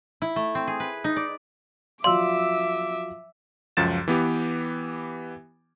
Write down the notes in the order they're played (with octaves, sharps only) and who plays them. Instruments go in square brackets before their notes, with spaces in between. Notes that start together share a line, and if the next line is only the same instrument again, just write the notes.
[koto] E4
A3
C4
G#4
B4
D#4
D5
[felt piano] F3 F#3 D5 [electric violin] E5 D6 [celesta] F5 E6 [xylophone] C6
[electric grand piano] C#2 F#2 F3 A6 E7
E3 B3 G4